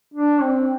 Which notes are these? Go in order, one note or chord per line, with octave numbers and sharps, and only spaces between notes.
D4
C4